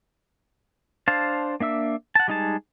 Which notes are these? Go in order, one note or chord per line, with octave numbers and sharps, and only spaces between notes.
D4 C5 F5 A5
A#3 D4 E5 E6
F#5 A5
G3 G#3 D#4 G#4 A5